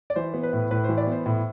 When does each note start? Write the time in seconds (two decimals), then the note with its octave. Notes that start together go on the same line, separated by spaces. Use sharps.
0.10 D5
0.16 E3 C5
0.34 B3
0.43 B4
0.53 A2
0.71 A2 B4
0.84 E3 C5
0.97 D5
1.07 B3 C5
1.26 A2